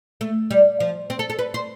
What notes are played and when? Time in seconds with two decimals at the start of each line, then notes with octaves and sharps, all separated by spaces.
0.21 A3
0.51 G3
0.80 F3
1.10 C4
1.19 A4
1.30 A4
1.39 B4
1.54 C5